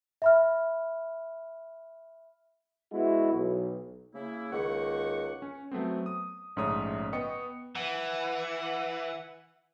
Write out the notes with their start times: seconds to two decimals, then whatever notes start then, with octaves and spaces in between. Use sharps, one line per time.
0.22 E5 B5 F6
2.92 G#3 B3 E4 F#4
3.32 B1
4.15 C#3 A#3 E4
4.53 C#2 D#3 A#3 F#5 C#6
5.42 C#4
5.72 F#3 A3 B3 C4
6.06 D#6
6.56 A#1 G#2 C#3 A3 C#5 D#6
7.13 B3 D#5 G5 C#6 C#7
7.76 E3 F#5